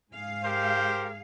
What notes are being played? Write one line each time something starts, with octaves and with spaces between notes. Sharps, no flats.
G#2 G#4 F5
G4 A#4 C5